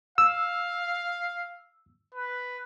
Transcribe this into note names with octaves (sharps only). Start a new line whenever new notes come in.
F5 E6
B4